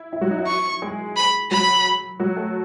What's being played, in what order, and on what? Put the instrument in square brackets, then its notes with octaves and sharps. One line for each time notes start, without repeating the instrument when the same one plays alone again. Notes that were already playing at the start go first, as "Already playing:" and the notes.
Already playing: [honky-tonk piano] E4
E4
F#3 F#4
D#4
E4
[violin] C#6
[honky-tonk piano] G#3 G#4
[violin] B5
[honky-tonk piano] F#3 F#4 [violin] B5
[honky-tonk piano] F#3 F#4
A3 A4